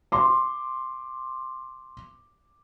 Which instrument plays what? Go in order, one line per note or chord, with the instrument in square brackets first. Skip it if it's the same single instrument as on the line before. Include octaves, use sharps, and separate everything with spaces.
[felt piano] C6 D6